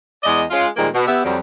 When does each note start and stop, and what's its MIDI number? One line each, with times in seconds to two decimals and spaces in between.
0.24 0.42 40
0.24 0.42 56
0.24 0.42 74
0.24 0.42 75
0.50 0.67 56
0.50 0.67 61
0.50 0.67 65
0.76 0.87 46
0.76 0.87 51
0.76 0.87 53
0.76 0.87 55
0.76 0.87 56
0.76 0.87 58
0.94 1.07 47
1.07 1.21 59
1.07 1.21 67
1.07 1.21 76
1.24 1.38 41
1.24 1.38 54
1.24 1.38 55